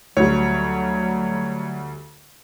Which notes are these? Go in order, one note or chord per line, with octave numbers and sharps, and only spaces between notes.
D2 F#3 G3 C#5